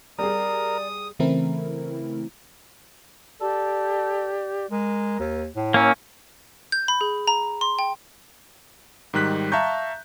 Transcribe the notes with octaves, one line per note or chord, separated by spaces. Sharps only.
G3 G#4 A#4 D5 D#6
C#3 E3 A3 C4 E4 A#4
G4 A4 D5
G#3 A#4
D#2
A2
A#3 C#4 F5 A#5 E6
G6
B5
G#4
A#5
C6
G5
G#2 D#3 G3 F#6 B6
E5 F5 A5 A#5 C#6 G6